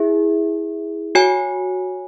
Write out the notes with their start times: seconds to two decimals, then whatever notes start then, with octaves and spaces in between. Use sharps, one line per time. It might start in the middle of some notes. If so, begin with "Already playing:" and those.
Already playing: E4 G#4 E5
1.15 F#4 C#5 G#5